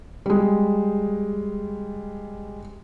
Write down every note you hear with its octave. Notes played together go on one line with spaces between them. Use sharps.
G3 G#3